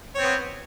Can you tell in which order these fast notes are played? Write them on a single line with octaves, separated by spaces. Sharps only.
C#5 C4 B3